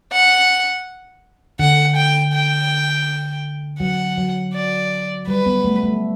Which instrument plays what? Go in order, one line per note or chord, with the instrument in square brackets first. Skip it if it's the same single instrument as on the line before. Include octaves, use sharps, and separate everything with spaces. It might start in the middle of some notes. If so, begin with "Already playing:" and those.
[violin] F#5
[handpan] D3 [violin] F#5
[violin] G5
G5
[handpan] F#3 [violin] F#5
[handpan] F#3
[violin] D5
[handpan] G3 [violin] B4
[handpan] B3
A3
A3